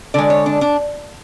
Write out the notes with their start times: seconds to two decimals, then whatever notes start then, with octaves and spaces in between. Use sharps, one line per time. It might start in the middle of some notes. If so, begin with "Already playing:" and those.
0.14 D3 G#3 D5
0.30 C#5
0.46 D4
0.61 D4